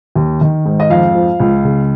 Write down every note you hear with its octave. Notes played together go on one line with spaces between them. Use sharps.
D#2
D#3
G#2
D#5
F2 F5
F3
C#2
C#3